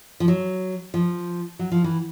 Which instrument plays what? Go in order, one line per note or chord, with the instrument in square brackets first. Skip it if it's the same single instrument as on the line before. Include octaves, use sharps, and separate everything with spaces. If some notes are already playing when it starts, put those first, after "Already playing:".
[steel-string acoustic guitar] F3
F#3
F3
F#3
F3
E3